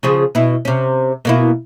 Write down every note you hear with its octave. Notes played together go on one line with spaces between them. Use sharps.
C#3 F3 G#4
B2 E4
C3 C#4
B2 A#3 E4